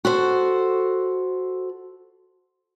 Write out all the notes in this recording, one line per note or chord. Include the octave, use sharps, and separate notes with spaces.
F#4 A4 C5